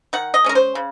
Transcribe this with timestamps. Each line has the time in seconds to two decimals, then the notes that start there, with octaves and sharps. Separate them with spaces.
0.13 D#3 F#5
0.34 D#5
0.44 G#3 C#4 A#4
0.55 C5
0.75 C#3